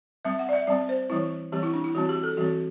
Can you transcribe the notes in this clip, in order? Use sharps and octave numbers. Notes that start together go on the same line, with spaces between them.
G3 C4 E5
F#5
D5
E5
G3 C4 D5
C5
E3 G3 C4 E4
E3 G3 C4 G4
E4
D4
E4
E3 G3 C4 F#4
G4
A4
E3 G3 C4 F#4